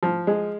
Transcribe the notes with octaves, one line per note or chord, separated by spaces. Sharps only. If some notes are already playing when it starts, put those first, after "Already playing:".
F3
G#3